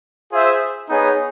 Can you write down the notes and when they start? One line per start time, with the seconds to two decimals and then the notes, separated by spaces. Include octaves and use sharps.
0.32 F4 G#4 C5 E5
0.90 B3 D#4 G#4 C#5